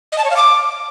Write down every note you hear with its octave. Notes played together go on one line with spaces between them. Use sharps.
D#5
A5
C#5
F5
D6